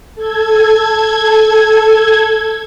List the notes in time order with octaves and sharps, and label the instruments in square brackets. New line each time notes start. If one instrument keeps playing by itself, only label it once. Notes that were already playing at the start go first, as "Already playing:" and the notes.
[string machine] A4 G#6